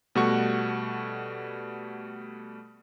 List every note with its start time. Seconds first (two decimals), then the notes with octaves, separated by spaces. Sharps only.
0.15 B2 G3 A3 F#4 C#6